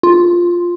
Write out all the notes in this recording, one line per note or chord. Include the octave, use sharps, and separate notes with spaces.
F4